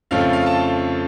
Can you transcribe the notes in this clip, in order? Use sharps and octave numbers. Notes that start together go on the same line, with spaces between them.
F2 C#3 F3 A3 F5
F5
A5